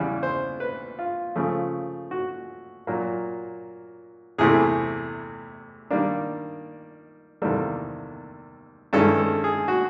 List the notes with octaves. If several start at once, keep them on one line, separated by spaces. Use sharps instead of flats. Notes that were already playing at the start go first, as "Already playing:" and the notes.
Already playing: E2 C#3 E3 G3
C5
B4
F4
C#3 F3 A3
F#4
A#2 F#3 A#3
E2 C3 E3 A3 G#4
D#3 G3 A#3 D4
E2 C3 D#3 G3 A#3 A4
G2 D#3 G#3 C#4 E4 A4
A4
G#4
F#4